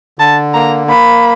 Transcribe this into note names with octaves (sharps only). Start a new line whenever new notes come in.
D3 A5
A#3 A#5
A#3 B5